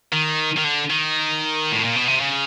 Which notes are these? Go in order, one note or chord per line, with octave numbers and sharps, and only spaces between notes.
D#3
D#3
D3
D#3
A2
A#2
B2
C3
C#3